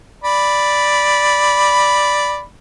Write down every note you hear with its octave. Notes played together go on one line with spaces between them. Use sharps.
D5 B5